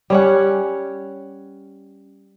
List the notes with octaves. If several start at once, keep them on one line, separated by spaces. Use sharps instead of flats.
G3 C#4 F#5